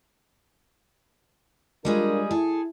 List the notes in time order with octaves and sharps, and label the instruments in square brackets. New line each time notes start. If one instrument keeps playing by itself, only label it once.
[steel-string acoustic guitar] G3 G#3 G#4 [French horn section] D4 F4 A#4
[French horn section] E4 [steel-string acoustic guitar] G#4 A4